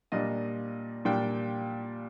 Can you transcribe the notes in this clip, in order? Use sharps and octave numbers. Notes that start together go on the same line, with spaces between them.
A#2 G3 D4 D#5
A#2 G3 D4 G5